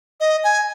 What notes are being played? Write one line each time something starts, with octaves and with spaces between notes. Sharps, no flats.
D#5
G#5